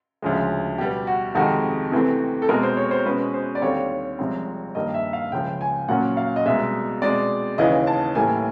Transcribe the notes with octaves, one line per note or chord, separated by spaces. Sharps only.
D2 C#3 F3 G#3
B2 G3 B3 G4
F#4
F2 C3 D#3 G#3 F#4
C3 E3 A3 C4
A4
B2 G#3 C4 A#4
C5
C#5
C5
B2 G#3 C#4 B4
C5
D5
D#2 D3 G3 C4 C#5
C2 C3 F3 G#3 C4
G2 D#3 G3 A#3 D#5
E5
F5
C#2 C#3 F3 G5
G#5
A#2 F#3 A#3 C#4 F#5
F5
D#5
C2 B2 G#3 E5
B2 G#3 C4 D5
D#2 C#3 E3 D#5
A5
A2 E3 G3 A#3 G#5